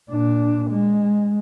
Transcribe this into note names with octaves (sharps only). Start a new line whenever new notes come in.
A#2 D4
G#3